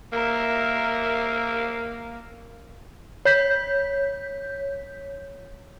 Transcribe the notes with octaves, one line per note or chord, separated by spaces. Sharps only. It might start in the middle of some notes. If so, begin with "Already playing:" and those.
A#3 A#4 E5
C#5 G6 B6